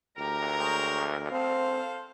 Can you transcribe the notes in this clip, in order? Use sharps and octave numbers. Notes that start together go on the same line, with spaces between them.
D2 G4 A#4 A#5
G#3 C#5 G5
C4 A4 C5 F5